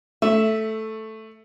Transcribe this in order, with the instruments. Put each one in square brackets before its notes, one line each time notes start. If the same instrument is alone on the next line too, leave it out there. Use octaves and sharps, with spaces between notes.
[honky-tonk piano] A3 [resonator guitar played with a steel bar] E5